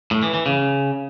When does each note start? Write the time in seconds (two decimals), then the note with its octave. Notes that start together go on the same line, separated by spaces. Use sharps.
0.11 A2
0.23 E3
0.34 E3
0.46 C#3